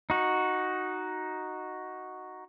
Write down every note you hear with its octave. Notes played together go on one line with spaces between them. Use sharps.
D#4 F#4